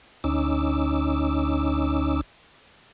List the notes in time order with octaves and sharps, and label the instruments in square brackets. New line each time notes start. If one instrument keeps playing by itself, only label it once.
[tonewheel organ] D2 C#4 D#4 D6 E6